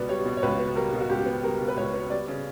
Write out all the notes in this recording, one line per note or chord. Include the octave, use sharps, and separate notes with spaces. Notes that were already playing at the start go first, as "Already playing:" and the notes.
Already playing: C#2 B2 B3 D5
G3 C#5
B2
C#5
C#2 B4
B3
G3 A#4
B2
F#4
C#2 G4
B3
G3 A#4
B2
B4
C#2 C#5
B3
C#5
G3 D5
C#3